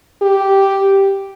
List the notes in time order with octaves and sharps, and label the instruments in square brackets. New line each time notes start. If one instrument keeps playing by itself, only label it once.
[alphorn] G4